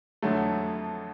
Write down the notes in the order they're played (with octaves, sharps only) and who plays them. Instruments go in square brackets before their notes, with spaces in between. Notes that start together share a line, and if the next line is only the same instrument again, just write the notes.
[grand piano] F2 D3 F#3 A3